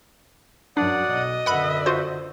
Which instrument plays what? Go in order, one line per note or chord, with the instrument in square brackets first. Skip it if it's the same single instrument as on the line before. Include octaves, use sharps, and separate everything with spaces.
[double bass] F#2 F#3 [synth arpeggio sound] D4 [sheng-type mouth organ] D5 F#5 D#6
[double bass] B1 [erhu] D#5
[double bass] F#2 D3 [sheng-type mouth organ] B4 E5 [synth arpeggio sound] F#5 B5
[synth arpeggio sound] F4 F#4 C5